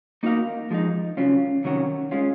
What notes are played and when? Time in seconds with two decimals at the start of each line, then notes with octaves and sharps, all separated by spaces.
0.23 A#3 D#4 F#4 A#4 F5
0.71 F3 G#3 D#4
1.17 C#3 F#3 C#4 F4
1.64 C3 D#3 F#3 C#4 F#4
2.11 G#3 C#4 F4